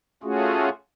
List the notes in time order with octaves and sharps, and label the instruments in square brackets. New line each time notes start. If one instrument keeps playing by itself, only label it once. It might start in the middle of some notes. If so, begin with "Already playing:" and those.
[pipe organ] A3 C#4 F4 F#4 G#4